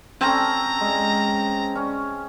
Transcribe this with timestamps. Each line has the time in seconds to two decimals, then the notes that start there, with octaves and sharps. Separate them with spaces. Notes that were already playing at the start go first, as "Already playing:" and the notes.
0.21 C4 C#4 A4 A#5
0.81 G#3
1.75 C#4